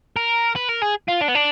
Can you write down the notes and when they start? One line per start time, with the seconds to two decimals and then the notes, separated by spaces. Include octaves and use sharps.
0.16 A#4
0.56 B4
0.69 A#4
0.82 G#4
1.09 F4
1.22 D4
1.29 B3
1.35 D4